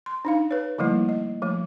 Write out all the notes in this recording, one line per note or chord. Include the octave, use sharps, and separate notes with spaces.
C6
D4 D#4 F5
B4 C#5
D3 F3 G3 A3 A#3 E4
D#5
F3 A3